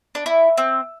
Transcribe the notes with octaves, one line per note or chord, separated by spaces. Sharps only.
D4
E4
C4